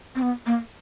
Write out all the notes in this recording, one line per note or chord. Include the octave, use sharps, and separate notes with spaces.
C4
B3
A#3